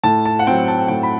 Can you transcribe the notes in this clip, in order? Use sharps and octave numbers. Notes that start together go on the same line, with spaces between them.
A2 A5
A5
F#5
F#3 C4 G5
A5
A2 G5
B5